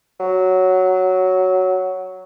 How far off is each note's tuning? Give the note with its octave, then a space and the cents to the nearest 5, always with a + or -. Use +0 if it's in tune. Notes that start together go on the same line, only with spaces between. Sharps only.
F#3 +5